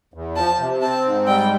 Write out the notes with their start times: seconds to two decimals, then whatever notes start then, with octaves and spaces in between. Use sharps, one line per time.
0.14 E2
0.36 F3 A5
0.59 C3
0.81 C4 A5
1.05 G#2
1.27 G3 G5